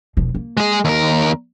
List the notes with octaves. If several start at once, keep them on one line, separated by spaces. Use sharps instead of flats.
E1 F3
A#3
G#3 G#4
D#2 A#4